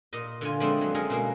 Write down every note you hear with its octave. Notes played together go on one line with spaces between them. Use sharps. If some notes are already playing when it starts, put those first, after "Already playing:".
A#2 D#5
D3 F4 G#5
F3 G#3 A3 B3 C4 D4
F#3
G#3 C#4 G#4 A#4
B2 G#3 A#3